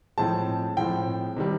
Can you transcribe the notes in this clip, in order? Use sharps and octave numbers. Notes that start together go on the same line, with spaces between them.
A2 F3 G#3 C4 A5
A2 F3 G#3 C4 G5
C3 D#3 G3